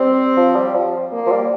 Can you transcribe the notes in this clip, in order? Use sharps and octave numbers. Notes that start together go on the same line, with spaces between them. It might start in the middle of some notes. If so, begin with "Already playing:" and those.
Already playing: G3 C4
F3
G3
F3
A#3
F3
G3